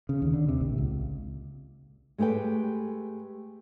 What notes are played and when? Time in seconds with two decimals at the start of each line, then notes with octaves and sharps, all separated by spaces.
0.09 C#3
0.22 D#2
0.34 D3
0.48 C3
0.60 A#1
0.78 C#2
2.18 G#3 A3 G4 B4 G5